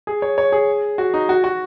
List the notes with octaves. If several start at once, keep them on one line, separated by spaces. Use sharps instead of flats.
G#4
C#5
C#5
G#4
F#4
D#4
F#4
F#4